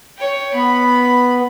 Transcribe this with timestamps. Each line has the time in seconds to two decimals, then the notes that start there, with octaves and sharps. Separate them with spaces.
0.18 C#5 G5
0.54 B3 B5